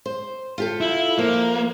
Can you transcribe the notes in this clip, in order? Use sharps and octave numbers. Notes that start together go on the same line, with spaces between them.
C5
F4 G4 A4
E4
F3 A#3